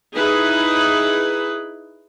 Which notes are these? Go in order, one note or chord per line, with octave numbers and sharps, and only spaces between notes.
D#4 E4 G#4 B4